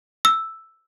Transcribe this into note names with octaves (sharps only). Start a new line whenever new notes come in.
E6